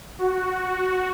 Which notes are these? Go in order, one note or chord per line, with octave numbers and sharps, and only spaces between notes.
F#4